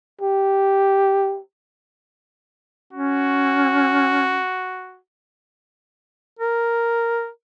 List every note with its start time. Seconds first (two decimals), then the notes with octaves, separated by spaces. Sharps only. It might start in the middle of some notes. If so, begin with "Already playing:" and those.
0.21 G4
2.93 C#4 F#4
6.39 A#4